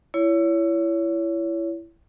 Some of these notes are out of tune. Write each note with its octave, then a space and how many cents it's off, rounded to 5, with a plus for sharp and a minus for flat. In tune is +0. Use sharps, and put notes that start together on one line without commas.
E4 +20 C#5 +25